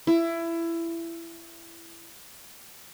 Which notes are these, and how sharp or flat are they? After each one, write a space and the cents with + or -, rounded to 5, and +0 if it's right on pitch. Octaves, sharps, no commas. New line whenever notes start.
E4 +20